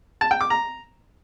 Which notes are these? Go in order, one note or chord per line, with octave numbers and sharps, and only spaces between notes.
A5
G5
D6
A#5